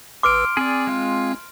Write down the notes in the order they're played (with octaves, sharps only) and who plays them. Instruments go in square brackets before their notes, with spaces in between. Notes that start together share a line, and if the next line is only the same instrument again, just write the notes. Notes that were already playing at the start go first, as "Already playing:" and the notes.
[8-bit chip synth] A1 B4 E6 [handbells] C6 F6 D7 [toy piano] D6
[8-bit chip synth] C4 [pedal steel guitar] G#4 D5
[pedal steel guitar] G#3 F4